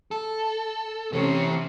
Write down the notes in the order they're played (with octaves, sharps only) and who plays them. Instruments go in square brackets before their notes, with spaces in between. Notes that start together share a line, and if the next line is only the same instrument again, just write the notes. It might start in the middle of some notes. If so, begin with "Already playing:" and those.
[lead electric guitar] A4
[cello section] C3 C4 C#4 [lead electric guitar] E3 C#5